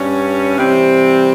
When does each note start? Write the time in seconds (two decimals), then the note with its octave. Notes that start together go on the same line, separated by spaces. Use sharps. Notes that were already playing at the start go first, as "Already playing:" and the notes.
Already playing: G2 G3 C#4
0.56 C3 E3 G3 C4